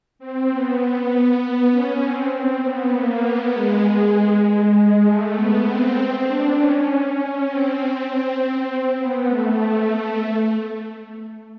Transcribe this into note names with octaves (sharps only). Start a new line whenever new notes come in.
C4
B3
B3
C#4
C4
C4
B3
A#3
B3
G#3
G#3
G#3
A3
B3
C4
D4
C#4
C4
C4
C4
B3
A3